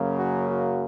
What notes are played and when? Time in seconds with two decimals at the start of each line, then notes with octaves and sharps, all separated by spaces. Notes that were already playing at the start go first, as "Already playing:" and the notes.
Already playing: F#2 C#3 F#3 A#3
0.16 F#4
0.48 F#4